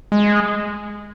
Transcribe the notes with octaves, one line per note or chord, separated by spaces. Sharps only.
G#3